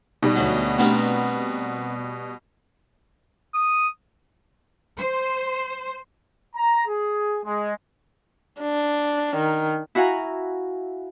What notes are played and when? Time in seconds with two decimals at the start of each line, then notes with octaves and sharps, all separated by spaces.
0.23 B2 G3 D#4
0.36 D2 F#3
0.78 A3 B3 C4 D4 G4 A#4
3.54 D#6
4.98 C5
6.55 A#5
6.87 G#4
7.45 G#3
8.61 D4
9.37 D#3
9.95 E4 F#4 F5 F#5 G#5 A#5